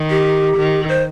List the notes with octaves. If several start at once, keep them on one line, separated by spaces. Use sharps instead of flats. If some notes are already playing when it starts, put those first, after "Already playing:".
Already playing: D#3
G4
D#3
C5